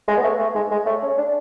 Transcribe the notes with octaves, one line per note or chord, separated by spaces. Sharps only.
G#3
B3
A3
A3
G#3
G#3
A3
C#4
D4